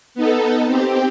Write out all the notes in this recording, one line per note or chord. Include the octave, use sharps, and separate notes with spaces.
B3 D#4 A4
C4 G4